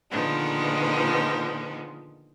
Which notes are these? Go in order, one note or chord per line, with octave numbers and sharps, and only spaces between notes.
A#2 D3 D#3 F3 G#3 B3